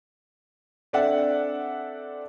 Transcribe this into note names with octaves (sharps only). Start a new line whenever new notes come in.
C4 D4 A4 D5 E5 F#5